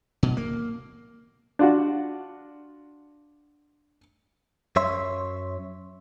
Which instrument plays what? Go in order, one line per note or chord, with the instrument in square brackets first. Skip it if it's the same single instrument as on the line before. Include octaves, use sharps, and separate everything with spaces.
[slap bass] B2
A#3
[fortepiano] D4 F4 F#4
[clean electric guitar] F#2 C#5 E5 C6